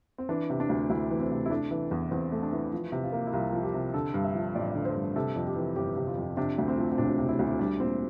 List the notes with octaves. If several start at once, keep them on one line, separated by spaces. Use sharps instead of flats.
C4
E3 D4
C3
D4
D2
D2 E4
E3
C4
C3
E4
A3 D4
E3
E2
E2 C4
A3
D4
E3
F3
C3
F4
A#3
E4
C2 F4
F3
G4
C3
D3 A4
G2
E5
F3
A1 D5
D3
C5
G2
C3 A4
F2
G4
E3
G1 G4
C3
F4
F2
C3 D4
D2
C4
F3
C4
E1 D4
C3
E4
D2
G3 D4
A#2 C4